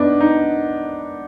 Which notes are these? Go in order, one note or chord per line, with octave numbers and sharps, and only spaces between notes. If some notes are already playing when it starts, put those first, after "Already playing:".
Already playing: B3 D4 D#4
D#4